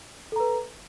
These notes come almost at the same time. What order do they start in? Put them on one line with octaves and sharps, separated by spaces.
A4 A#5 B4